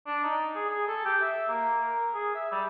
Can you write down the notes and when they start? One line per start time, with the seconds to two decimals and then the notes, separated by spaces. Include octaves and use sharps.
0.06 D4
0.23 D#4
0.55 G#4
0.69 G#4
0.87 A4
1.05 G4
1.21 E5
1.48 A#3
1.82 A#4
2.13 G#4
2.35 E5
2.52 G3